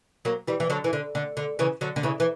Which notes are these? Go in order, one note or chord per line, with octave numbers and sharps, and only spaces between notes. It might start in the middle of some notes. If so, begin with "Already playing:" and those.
F#3 A#3
E3 G3
E3
D3 F#3
E3
D3
D3
D3
C#3 E3
D3 F#3
D3
C#3 E3
E3